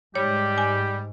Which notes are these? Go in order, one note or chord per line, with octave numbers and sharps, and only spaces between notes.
G#2 G3 G4 C#5
G#5